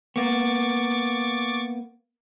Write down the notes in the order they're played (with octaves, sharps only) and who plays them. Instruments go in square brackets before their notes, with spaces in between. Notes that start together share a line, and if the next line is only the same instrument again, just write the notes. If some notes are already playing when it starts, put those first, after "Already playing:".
[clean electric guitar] A#3 B3 [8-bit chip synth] C#6 D6 A6